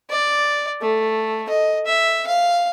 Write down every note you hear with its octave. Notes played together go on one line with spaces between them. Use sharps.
D5
A3
D#5
E5
F5